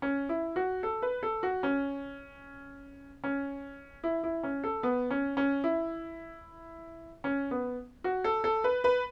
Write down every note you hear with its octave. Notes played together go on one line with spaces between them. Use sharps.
C#4
E4
F#4
A4
B4
A4
F#4
C#4
C#4
E4
E4
C#4
A4
B3
C#4
C#4
E4
C#4
B3
F#4
A4
A4
B4
B4